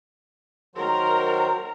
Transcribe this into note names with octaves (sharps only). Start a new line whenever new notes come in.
D#3 F#3 A#4 C5 A#5